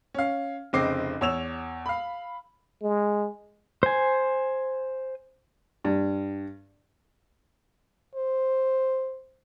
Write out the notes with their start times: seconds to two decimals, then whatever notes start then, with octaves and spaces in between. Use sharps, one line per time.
0.14 C#4 F5
0.73 F1 C#3 C4 D#5 D6 C7
1.21 E2 C#5 E6 E7 F7
1.86 F5 B5
2.82 G#3
3.83 C5 G#5
5.85 G2
8.15 C5